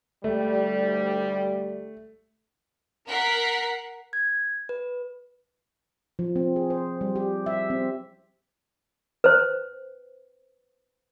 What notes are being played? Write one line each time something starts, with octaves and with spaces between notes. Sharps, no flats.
D2 G3 A3
A#4 F#5 B6 C7
G#6
B4
F3
C4
G#4
C5
G3
G4
E5
C4
B4 C5